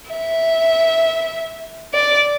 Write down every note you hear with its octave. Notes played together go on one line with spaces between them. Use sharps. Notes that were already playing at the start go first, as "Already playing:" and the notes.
E5
D5